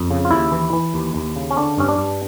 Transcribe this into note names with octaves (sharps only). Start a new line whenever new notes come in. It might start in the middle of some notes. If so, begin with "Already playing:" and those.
Already playing: F2
C#3
F4
D#2 E4
E3
E3
D#2
D#2
C#3
C#4
D3 D4
G2 C#4
D4
G2